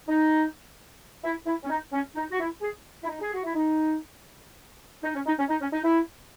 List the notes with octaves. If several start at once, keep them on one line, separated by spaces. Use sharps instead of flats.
D#4
E4
E4
C#4
D#4
C#4
D#4
F#4
E4
G#4
E4
D#4
G#4
F#4
E4
D#4
D#4
C#4
D#4
C#4
D#4
C#4
D#4
E4